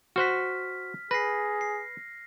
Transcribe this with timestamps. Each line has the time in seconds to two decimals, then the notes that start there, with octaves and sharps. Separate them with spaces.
0.16 F#4 C5 F#5 F6 B6
1.11 G#4 B4 A#6 C7
1.61 C7